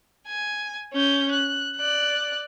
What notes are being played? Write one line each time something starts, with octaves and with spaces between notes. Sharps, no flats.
G#5
C#4 G6
F#6
D5 F#6